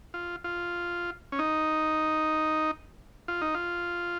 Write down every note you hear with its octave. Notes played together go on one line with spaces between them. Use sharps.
F4
F4
C#4
D#4
F4
D#4
F4